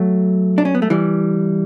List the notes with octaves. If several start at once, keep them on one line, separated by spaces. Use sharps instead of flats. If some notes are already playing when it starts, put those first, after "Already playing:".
Already playing: F#3 A3
D4
C#4
B3
A3
E3 G3